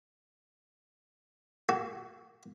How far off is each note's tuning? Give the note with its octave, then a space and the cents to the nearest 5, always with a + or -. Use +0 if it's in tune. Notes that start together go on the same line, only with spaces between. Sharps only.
F#4 +35